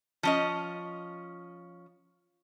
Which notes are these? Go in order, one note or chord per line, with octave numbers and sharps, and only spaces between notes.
F3 C#4 D#5